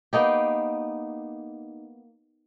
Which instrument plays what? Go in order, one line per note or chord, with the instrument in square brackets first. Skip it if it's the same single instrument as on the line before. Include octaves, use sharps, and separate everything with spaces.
[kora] A#3 B3 D#4 G4